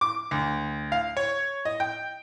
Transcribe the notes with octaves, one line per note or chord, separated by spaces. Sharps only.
D6
D2
F5
C#5
D#5
G5